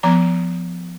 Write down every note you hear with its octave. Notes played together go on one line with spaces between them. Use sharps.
F3 B3 A#5